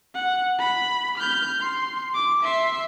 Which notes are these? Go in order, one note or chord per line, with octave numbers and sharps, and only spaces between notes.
F#5
B5
F6 G6
C6
D6
E5 C6